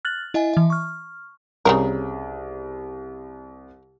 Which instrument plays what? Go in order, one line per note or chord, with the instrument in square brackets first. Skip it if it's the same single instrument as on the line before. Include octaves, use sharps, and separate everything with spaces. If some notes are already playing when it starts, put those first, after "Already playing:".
[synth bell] F6 F#6 A6 F#7
E4 D#5 E5 G#5
E3 E5
C#6 F6
[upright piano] C2 [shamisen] C#3 G#3 A#4